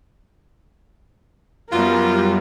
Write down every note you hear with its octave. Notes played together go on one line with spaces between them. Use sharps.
F#2 F#3 G3 B3 F4 A#4